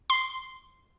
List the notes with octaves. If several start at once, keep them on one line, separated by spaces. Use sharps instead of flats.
C6